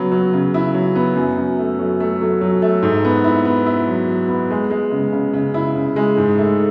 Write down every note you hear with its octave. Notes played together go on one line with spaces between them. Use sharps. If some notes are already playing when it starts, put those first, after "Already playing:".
Already playing: C#3 F#3 B3
F#3
C#3
E4
F#3
B3
F#2
F#2
A3
F#3
A3
F#3
F#3
A3
G#2
B3
E4
B3
E4
F#3
F#3
B3
G#3
G#3
C#3
C#3
C#3
E4
C#3
G#3
G#2
A3